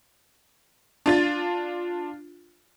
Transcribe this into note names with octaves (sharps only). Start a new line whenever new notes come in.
D4 F4 A6